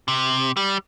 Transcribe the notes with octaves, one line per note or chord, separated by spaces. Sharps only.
C3
G3